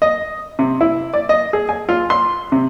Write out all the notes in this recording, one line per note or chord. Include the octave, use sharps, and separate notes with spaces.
D#5
C3
E4
D5
D#5
G#4
G#5
F4
C6
C3